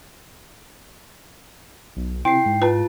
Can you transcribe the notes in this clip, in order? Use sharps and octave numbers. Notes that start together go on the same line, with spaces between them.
B1
C3 E4 G5 C7
G#2
F4 B4 A5